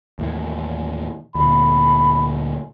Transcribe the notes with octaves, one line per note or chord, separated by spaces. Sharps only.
D#2 A2 E3
D2 A#2 B5